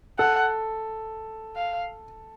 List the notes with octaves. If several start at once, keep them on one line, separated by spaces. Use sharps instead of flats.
A4 F#5
F5